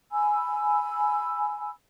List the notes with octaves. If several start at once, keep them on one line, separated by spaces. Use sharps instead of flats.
G#5 B5 E6